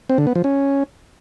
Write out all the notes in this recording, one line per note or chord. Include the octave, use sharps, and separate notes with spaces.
C4
D3
B3
F3
C#4